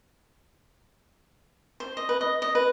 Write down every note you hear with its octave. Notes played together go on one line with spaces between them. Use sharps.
C5
D#5
B4
D#5
D#5
B4